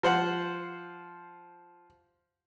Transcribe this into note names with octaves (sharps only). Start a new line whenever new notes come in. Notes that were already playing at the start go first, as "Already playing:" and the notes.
F3 C5 F#5